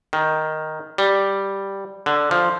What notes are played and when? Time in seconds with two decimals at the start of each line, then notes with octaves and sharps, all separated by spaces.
0.13 D#3
0.98 G3
2.06 D3
2.31 F3